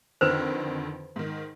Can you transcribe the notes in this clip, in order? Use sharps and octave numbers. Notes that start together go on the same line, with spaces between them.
F2 D3 D#3 B4 C5
G#2 D#3